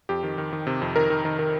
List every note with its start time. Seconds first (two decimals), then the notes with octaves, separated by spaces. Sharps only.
0.09 F2 G4
0.23 D#3
0.38 D#3
0.53 D#3
0.67 C3
0.82 F2
0.96 D#3 A#4
1.10 D#3
1.25 D#3
1.39 D#3